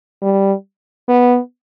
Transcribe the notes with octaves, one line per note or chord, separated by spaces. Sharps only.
G3
B3